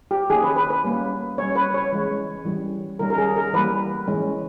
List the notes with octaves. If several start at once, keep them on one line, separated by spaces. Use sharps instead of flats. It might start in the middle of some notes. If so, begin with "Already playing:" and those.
G4
D#3 A#3 C#4 G#4
B4
B4
B4
G3 A#3 C#4
G3 C#4 C#5
B4
C#5
E3 G#3 C#4
E3 G3 C#4
D#3 G3 C#4 A#4
A#4
G#4
A#4
E3 G3 A#3 B4
E3 G#3 C#4